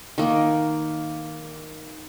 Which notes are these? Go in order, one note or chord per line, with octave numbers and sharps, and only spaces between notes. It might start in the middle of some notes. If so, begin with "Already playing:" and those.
D#3 A#3